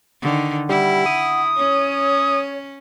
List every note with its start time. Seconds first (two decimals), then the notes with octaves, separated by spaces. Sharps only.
0.22 D3 D#3
0.69 G3 E4 F#5
1.06 D#6
1.57 C#4 C#5